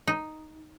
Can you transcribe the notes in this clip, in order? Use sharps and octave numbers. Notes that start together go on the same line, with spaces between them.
D#4